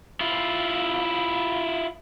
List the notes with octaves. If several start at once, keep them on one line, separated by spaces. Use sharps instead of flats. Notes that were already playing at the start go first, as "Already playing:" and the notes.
E4 F4